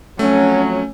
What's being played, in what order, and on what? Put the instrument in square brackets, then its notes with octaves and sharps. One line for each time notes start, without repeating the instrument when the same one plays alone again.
[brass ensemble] F2 F#3 [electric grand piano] A3 [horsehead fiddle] C#4